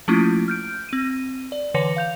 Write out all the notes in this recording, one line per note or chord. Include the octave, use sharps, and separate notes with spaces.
F3 A3 A#3 C#4 E4 F4
F6 G6 D7
C4 D#7
D5
D3 E3 B4 C#5 A#6 C#7
F5 G6 F7